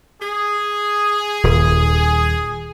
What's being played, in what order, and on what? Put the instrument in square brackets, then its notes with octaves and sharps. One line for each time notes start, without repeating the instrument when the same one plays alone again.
[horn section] G#4
[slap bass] D#1